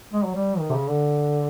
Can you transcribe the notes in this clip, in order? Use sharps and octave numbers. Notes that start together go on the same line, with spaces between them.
G#3
F#3
G3
D#3
C3
C#3
D3